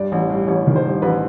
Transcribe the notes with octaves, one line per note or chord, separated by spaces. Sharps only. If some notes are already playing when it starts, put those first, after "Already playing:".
Already playing: G2 D5
A1
G2
A1 C#5
D#3
C5
G2
A1 B4